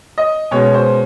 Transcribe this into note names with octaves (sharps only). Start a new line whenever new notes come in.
D#5
B2 G#3 C#4 C#5
C5